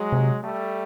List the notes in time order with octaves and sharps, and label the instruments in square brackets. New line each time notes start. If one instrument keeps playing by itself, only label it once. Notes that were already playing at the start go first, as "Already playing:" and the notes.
Already playing: [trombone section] F#3 G#3
[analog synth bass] C3
[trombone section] G3 A3